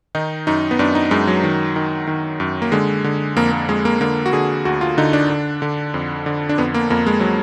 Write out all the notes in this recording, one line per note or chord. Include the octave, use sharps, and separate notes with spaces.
D#3 D#4
F#2 D#4
B3
F#2 D4
D#4
F#2 G#3
F#3
D#3
D#3
D#3
F#2
A#3
D3 G#3
D3
F2 A#3
A#3
F2 G#3
A#3
D3 A#3
F#4
D3 G#4
D2 F#4
F4
D3 D#4
D4
D3
D3
F2
D3
D4
F2 B3
A#3
F2 A#3
G#3
F#3